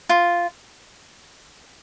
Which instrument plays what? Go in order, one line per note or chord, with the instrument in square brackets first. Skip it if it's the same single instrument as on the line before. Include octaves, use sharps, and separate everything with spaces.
[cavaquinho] F4